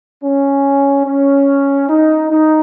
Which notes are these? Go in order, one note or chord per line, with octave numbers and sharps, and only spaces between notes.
C#4
C#4
D#4
D#4